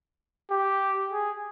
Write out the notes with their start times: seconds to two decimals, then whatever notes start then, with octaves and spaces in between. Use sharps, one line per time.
0.51 G4
1.10 G#4